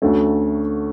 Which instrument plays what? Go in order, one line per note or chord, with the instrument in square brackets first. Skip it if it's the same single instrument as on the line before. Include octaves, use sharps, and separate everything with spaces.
[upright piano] D2 D3 A3 C#4